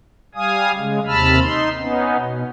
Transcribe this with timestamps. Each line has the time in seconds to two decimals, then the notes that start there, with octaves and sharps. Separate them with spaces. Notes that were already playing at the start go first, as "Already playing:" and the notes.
0.35 G3 F5 G#5 D#6
0.77 C#3 G#3
1.07 D#2 C3 A5 B5 E6 F6
1.40 D#4 C6
1.79 B3 C#4 D#4
2.18 B2